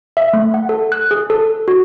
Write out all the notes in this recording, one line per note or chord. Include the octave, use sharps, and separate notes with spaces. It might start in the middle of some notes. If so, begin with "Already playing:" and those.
E5
A3
F#5
A4
F#6
G#4
A4
F#4